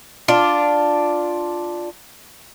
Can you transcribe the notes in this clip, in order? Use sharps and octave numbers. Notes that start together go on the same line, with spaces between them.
D4 F4